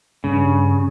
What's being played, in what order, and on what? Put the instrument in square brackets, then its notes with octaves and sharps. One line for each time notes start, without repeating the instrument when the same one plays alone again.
[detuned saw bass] G2 [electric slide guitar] C#3